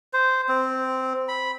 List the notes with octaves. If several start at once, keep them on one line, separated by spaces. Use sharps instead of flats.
C5
C4
B5